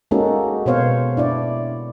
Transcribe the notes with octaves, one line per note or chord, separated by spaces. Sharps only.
G#3 A#3 C#4 D#4 F#4 A4
B2 B3 C4 C5 C#5 F5
D4 E4 D5